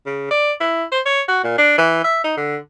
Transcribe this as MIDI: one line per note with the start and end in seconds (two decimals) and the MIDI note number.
0.06 0.29 49
0.31 0.52 74
0.60 0.84 64
0.92 1.00 72
1.06 1.22 73
1.28 1.43 66
1.44 1.53 46
1.58 1.74 62
1.78 2.02 52
2.04 2.19 76
2.24 2.33 63
2.37 2.57 50